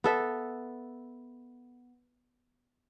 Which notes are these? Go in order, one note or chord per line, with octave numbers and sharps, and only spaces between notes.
B3 A4 E5